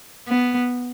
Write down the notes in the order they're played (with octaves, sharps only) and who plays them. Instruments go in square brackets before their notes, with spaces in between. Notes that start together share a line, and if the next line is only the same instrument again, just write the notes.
[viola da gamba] B3